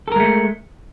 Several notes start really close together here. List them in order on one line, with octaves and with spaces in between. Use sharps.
A4 A#4 G#3 A3